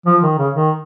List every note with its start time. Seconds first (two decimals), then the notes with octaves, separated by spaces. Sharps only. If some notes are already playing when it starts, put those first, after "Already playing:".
0.06 F3
0.23 D#3
0.38 C#3
0.54 D#3